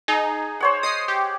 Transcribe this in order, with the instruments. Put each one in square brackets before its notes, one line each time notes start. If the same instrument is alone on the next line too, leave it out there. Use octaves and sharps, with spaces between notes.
[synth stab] D#4 [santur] G#4
[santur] C5 C#5 F#5
[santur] D#5 [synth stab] D#6 C7
[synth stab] G4